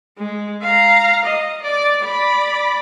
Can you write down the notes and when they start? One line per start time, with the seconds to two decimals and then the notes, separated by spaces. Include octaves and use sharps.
0.18 G#3
0.62 F5 A#5
1.24 D#5
1.62 D5
2.02 D5 B5